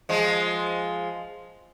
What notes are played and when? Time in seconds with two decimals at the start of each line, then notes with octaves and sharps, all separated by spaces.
0.09 F3 G#3